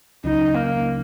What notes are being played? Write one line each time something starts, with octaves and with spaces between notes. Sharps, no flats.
C#2 C#3 F#3 C#4 D#4
A#3